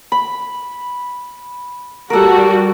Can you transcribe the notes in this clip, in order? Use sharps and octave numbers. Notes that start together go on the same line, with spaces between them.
B5
G3 F#4 A4 A#4